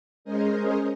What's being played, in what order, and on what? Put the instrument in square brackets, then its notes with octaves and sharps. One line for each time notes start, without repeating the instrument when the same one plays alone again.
[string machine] G#3 C#4 G#4 A#4 C5 D#5